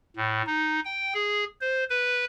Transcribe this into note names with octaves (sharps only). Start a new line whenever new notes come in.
A2
D#4
G5
G#4
C5
B4